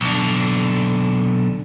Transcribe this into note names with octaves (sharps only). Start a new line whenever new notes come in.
B1 D3